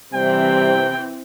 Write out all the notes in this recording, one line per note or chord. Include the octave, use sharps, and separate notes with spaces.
C3 E3 G3 C4 G5